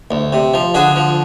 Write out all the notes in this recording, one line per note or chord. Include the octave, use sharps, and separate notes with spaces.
D2
C3
F3
D3 F#4 G#4
F3